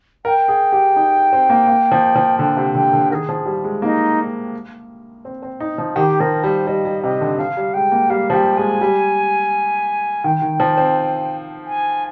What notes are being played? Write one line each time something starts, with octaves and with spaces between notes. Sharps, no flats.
A#4 G5
G#4
G4
D#4
C4
A#3
A#3
F3
F3
D3 G5
C3
D3 G5
D3
D#3 A#4
G#4
F3
G3
G#3
A#3 D#4
C4
C4
D#4
F3
D#3 G4
F3 A#4
G3 C5
G3 D#5
G3
C3 D#5
D3
F3 F5
G3
G#3 G5
A#3
G3 F5
F3
G3 G5
G#3 G#5
G3
D#3 G5
D#3
F3
C4
G#5